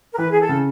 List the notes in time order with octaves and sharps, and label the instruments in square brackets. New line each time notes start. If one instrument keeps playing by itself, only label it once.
[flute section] A#4
[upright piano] E3 [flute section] B4
[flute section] G#4
A4
[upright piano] C#3